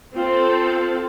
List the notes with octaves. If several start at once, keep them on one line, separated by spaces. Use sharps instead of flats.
C4 F4 A4